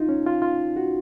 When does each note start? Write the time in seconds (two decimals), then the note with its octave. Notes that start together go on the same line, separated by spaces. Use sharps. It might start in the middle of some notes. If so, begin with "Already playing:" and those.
Already playing: D#4 F4
0.09 C#4
0.26 F4
0.42 F4
0.76 F#4